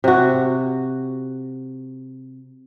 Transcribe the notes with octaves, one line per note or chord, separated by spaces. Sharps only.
C3 F#4